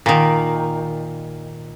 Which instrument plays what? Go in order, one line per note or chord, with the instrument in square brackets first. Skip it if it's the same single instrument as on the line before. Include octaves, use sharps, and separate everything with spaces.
[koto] A#2 D#3